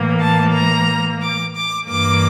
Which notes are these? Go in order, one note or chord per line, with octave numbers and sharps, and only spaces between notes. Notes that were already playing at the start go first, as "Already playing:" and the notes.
Already playing: A2 E3 A#3
A5
A#5
D6
D6
G2 E3 A#3 D6